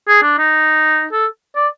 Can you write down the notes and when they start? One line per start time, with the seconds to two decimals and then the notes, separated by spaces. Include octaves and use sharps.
0.08 G#4
0.23 D4
0.38 D#4
1.12 A4
1.56 D5